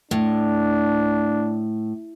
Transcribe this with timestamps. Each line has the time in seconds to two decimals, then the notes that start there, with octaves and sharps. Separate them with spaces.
0.11 A2 D4